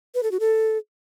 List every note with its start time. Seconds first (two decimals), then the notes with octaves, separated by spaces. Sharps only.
0.15 B4
0.23 A4
0.32 F#4
0.40 A4